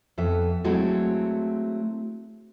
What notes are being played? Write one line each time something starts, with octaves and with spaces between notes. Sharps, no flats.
F2 B3 E5
F#3 G#3 A3 C4 E4 F#4